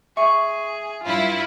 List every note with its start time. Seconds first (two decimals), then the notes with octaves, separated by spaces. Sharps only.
0.17 G#4 E5 C#6
1.03 G2 E4 F4